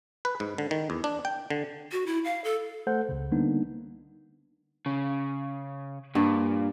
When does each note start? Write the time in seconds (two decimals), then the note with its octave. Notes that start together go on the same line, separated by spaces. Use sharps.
0.25 B4
0.40 G#2
0.58 D3
0.71 D#3
0.90 E2
1.04 D4
1.25 G5
1.50 D3
1.92 F#4
2.06 E4
2.25 F5
2.44 A4
2.87 A3 A4 C5 F#5 G6
3.09 C#2 C#3
3.32 D3 G3 A#3 B3 D4 D#4
4.86 C#3
6.15 G2 A#2